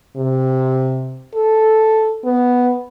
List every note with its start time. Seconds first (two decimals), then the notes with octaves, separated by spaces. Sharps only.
0.16 C3
1.35 A4
2.25 B3